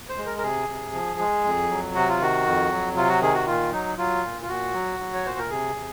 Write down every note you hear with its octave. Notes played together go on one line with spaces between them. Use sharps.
C5
G#3
A#4
A#4
C3 G#4
C3
F3
G#3
F2
F#3
C3 F#4
F4
D#3 F#4
F2
F#3
C3 F4
F#4
D#3 G#4
F#4
A#2 F4
F#3 D#4
F#3 F4
A#2
F4
A#2 F#4
F#3
F#3
C#5
A#2 C5
A#4
C3 G#4
C3